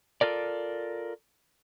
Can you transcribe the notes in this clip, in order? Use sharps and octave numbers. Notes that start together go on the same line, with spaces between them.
F4 A4 A#4 D5